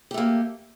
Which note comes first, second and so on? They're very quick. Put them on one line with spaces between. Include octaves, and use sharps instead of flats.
G4 A3 A#3